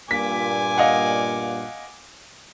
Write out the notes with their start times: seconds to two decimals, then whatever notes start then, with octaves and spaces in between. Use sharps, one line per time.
0.11 G2 A#2 G#5 D6 B6
0.78 D#5 F5 F#5